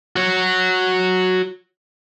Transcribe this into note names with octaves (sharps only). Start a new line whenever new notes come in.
F#4 C#5